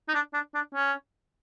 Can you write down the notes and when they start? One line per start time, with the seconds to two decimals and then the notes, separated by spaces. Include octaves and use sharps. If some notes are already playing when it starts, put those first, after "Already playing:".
0.08 D#4
0.14 D4
0.34 D4
0.54 D4
0.75 C#4